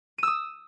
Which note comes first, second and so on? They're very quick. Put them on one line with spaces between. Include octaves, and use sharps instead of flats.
D#7 E6 D#6